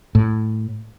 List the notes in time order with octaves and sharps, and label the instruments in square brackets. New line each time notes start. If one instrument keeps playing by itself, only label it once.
[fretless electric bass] A2